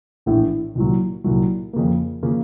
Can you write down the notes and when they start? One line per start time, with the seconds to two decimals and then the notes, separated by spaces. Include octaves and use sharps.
0.26 A#1 A2 E3
0.75 C2 A#2 F#3
1.24 C2 A#2 F#3
1.73 F2 C#3 F3 A#3
2.23 C#3 F3 A#3